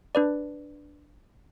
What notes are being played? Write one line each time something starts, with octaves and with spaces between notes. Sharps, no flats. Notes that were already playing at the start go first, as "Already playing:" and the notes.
D4 B4 D5